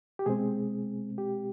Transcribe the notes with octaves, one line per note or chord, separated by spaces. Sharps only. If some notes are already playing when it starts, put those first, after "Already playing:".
G4
B2 G#3 C4 G#4
G4